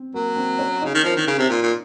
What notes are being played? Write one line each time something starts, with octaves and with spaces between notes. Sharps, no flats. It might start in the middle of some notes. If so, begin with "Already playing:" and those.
Already playing: C4
F#3 A#3
C4
C#4
C#3 D#4
D#3
F3 A#4
D#3
C#3
C3
A#2
A#2